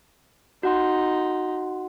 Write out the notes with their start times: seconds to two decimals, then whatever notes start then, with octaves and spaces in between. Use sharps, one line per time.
0.63 D#4 F#4 F#5 C6